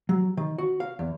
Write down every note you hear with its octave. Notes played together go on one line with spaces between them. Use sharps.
F#3
D#3
F#4
F5
E2